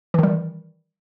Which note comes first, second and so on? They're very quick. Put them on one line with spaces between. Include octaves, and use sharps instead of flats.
E3 D#3 G3